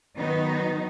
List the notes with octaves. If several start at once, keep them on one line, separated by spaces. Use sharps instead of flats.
D#3 F#3 B3 D#4